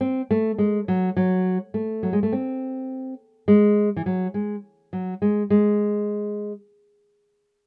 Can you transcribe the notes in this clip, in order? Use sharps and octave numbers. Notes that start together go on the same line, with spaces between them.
C4
A3
G#3
F#3
F#3
A3
F#3
G#3
A3
C4
G#3
E3
F#3
G#3
F#3
G#3
G#3